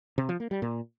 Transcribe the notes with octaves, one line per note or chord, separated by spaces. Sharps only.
C3
F3
A#3
G3
A#2